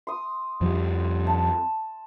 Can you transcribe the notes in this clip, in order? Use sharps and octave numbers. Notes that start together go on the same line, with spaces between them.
C6 D#6
F2 F3 G3
A5